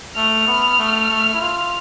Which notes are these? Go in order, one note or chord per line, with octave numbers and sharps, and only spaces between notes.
A3 F6
B3
A3
A3
E4
F4